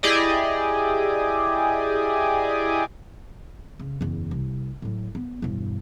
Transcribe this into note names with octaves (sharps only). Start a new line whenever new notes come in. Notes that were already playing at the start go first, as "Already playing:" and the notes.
E4 G4 G#4 D5 D#5
C#3
F#1 E2
C2
A2 F#3
B3
E1 G2